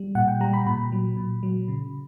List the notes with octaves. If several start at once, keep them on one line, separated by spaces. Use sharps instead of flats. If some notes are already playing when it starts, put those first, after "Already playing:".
Already playing: G3
A#2 F#5
G5
G3 A#5
B5
A#2 B5
F#3
A#2
F#3
C#3